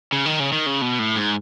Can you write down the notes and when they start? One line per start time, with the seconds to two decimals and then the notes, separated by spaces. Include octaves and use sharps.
0.12 C#3
0.26 D#3
0.40 C#3
0.52 D#3
0.66 C#3
0.82 B2
0.99 A2
1.16 G#2